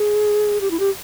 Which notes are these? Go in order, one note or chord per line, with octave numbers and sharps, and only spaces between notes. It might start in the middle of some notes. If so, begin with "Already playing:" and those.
Already playing: G#4
G4
E4
G4